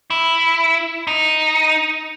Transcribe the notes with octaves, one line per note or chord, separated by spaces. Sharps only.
E4
D#4